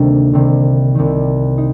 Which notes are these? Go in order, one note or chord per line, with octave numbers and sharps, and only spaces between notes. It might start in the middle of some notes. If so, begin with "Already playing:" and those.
Already playing: D2 C3 D#3 G3 A#3
C2 C3 D#3
C2 C3 D#3
D#4